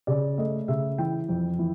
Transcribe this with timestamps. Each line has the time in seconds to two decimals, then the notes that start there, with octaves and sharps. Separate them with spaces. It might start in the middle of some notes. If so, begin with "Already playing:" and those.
0.07 C#3 D5
0.38 A3 D#5
0.68 C#3 E5
0.98 E3 G5
1.29 F2
1.59 E3